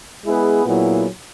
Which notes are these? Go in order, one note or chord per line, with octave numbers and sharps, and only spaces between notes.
G#3 B3 E4 G#4 B4
A#2 F#3 B3 E4 G#4